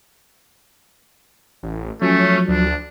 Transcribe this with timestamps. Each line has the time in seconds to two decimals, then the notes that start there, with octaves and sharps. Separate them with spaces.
1.63 A1
2.02 F3 F#3 A3 C#4
2.48 D2 D4